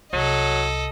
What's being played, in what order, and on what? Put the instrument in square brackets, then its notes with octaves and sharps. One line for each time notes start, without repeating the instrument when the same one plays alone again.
[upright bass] C2 [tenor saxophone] F#3 [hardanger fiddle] A4 D#5